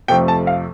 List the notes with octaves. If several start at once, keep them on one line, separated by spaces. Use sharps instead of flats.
F2 C3 F3 A3 G5
A5
F5